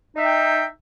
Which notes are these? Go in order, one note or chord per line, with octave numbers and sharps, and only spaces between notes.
D#4 E5 G5